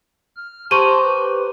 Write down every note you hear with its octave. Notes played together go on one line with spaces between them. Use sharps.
F6
G4 C5 A5 A#5 C6 C#6 D#7
B4